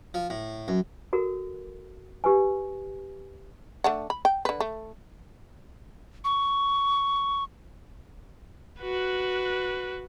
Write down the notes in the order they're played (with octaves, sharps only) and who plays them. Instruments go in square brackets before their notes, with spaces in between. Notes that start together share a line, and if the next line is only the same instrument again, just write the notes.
[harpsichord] F3
A2
F#2
[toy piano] F#4 A4 A#4
G4 B4 G#5
[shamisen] A3 D4 F#5
B5
G5
D3 B4
A3
[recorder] C#6
[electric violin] F#4 B4